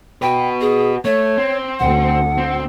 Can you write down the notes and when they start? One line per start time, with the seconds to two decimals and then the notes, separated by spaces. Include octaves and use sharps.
0.22 F#4 B4 G5
0.61 G#4
1.05 A3 C#5
1.37 C4
1.79 D2 F#5
2.38 C4